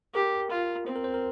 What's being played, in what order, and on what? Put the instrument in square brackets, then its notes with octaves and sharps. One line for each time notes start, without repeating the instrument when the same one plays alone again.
[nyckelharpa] G4 [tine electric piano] A#4
[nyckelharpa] F4
[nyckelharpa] C4 [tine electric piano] C5
[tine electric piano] A#4
C5
A#4